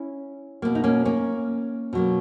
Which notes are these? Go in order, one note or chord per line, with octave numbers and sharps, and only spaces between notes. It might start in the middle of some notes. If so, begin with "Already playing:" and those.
Already playing: C#4 E4
B2 A#3
D#4
A#3 C#4
A#3 C#4
B2 F#3 A#3